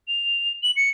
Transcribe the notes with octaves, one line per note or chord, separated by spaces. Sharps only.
F7
F#7
C#7